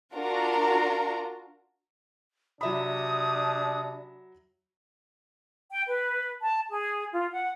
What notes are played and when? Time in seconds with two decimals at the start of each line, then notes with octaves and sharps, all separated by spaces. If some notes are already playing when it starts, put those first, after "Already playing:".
0.14 D4 F4 F#4 A#4 A#5
2.61 C3 F#3 D4 E5 B5 D#6
5.71 G5
5.88 B4
6.42 A5
6.69 G#4
7.13 F4
7.32 F#5